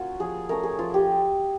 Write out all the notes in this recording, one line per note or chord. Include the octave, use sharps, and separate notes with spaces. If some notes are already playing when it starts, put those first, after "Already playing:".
Already playing: A#3 C#4 F4 F#4
F3 G#4
A3 C#4 A#4
G#4
F3 F4
G4